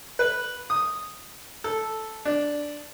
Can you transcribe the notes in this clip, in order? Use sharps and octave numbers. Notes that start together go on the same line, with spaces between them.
B4
D#6
A4
D4